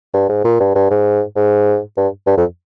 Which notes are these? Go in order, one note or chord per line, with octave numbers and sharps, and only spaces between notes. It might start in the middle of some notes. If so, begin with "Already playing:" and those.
G2
G#2
A#2
G2
G2
G#2
G#2
G2
G2
F2